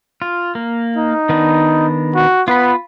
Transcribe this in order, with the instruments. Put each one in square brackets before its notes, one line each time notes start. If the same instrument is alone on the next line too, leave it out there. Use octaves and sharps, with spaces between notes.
[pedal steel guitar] F4
A#3
[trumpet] D#4
[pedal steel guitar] D#3 B3 D4
[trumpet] F#4
[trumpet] B3 [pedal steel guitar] F4 B5